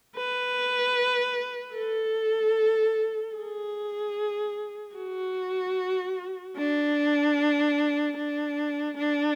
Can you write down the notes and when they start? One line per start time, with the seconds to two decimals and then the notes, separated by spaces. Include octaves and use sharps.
0.16 B4
1.75 A4
3.36 G#4
4.96 F#4
6.57 D4
8.17 D4
8.97 D4